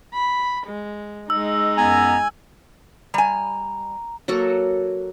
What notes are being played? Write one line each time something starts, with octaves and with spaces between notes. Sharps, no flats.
B5
G#3
G#3 D#4 E6
F#2 B3 G#5 A#5
G3 G#5 A#5
F#3 A#3 F#4 A4